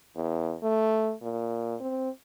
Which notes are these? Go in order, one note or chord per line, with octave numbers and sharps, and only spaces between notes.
E2
A3
A#2
C4